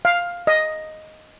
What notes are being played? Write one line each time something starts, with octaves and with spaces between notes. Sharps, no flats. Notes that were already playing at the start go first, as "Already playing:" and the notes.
F5
D#5